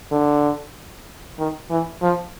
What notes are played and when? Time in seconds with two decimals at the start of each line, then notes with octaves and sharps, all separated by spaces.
0.11 D3
1.38 D#3
1.70 E3
2.02 F3